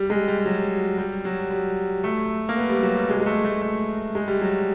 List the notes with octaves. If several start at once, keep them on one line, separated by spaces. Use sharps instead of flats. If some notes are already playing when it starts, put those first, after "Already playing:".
Already playing: G3
G#3
G3
G3
F#3
G3
F#3
G3
A3
A#3
B3
G3
F#3
G3
G#3
G#3
A3
A3
A3
G#3
G3
F#3